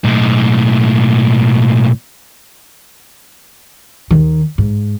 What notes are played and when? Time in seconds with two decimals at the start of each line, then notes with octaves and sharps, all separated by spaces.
0.04 B1 A2
4.11 D#2 D#3
4.58 G#2